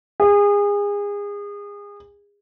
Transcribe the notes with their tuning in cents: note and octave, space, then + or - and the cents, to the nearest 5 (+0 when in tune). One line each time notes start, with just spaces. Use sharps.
G#4 -30